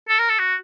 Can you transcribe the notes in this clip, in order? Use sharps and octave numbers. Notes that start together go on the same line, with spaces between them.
A4
A#4
A4
F#4